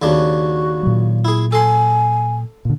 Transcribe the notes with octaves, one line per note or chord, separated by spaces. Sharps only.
D#2 C#3 D4 F#4
A#2 F#3
E4 G#4
A4 G#5 C6
A#2 D3